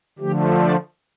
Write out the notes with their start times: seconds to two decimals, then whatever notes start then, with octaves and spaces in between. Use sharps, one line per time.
0.19 D3 F3 A3 G4
0.60 D5